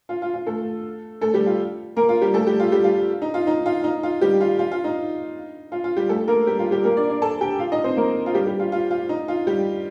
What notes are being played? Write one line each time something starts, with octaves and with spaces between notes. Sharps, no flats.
F4
F4
F4
A3 A4
A3 A4
G3 G4
F4
A#3 A#4
F4
G3 G4
A3 A4
G3 G4
F4
G3 G4
F4
D#4
F4
D#4
F4
D#4
F4
G3 G4
F4
F4
F4
D#4
F4
F4
G3 G4
A3 A4
A#3 A#4
G3 G4
F4
G3 G4
A#3 A#4
D4 D5
D4 D5
A4 A5
G4 G5
F4 F5
D#4 D#5
C4 C5
A#3 A#4
F4
G3 G4
G3 G4
F4
F4
F4
D#4
F4
G3 G4